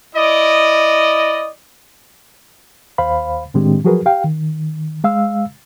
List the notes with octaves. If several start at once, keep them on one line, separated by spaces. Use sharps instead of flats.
E4 D5 D#5
D#2 C5 F5 B5
A2 D#3 G#3 C4 D4 G4
F3 F#3 F#4 G#4 A#4 B4
G4 F5 G5
D#3
G#3 F5 E6